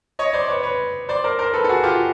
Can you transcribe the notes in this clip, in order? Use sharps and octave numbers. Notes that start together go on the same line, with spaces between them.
C#5 D#5
C5 D5
B4 C#5
B4 C#5
C5 D5
A#4 C5
A#4 C5
A4 B4
A4
F#4 G#4
F4 G4